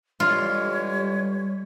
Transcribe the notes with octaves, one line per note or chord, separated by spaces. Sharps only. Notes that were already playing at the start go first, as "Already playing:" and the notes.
D3 E3 G3 G#3 F4 C#5